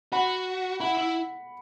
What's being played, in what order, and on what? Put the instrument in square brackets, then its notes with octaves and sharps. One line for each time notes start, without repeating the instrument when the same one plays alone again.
[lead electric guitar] F#4 [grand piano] F#5 B5
[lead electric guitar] E4 [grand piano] F#5 B5
[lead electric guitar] E4